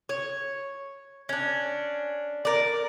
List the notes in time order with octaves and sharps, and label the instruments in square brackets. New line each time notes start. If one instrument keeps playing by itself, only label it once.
[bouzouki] C#5
C#4 D4
A#4 D5